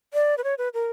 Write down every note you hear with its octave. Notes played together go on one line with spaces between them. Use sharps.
D5
B4
C#5
B4
A#4